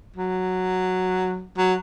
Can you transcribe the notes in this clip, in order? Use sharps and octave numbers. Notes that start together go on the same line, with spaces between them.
F#3
F#3